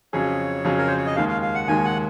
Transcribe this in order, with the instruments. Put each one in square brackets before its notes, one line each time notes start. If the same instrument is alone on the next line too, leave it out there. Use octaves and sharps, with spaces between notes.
[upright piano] F2 C#3 F#3 C#4 G#4 [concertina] C#5
[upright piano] F2 C#3 F#3 C#4 G#4
[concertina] A#4
C5
C#5
D#5
[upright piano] D#2 D#3 G#3 [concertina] F5
[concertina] F5
F5
F#5
[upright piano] D#2 D#3 G#3 [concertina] G#5
[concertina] F#5